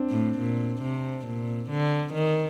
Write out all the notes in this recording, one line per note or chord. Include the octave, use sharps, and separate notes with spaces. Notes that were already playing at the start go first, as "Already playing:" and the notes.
Already playing: C4 D4
A2
A#2
C3
A#2
D3
D#3